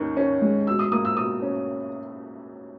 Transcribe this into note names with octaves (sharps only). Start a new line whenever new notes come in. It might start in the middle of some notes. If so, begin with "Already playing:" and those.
Already playing: D#2 D#3 C#4
C#4
G#3
B2 E6
D#6
A#3 D#6
E6
B2 D#6
C#4